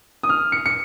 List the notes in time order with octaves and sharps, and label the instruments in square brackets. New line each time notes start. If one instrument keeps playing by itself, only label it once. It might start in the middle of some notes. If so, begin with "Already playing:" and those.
[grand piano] D#6
F6
C#7
C#7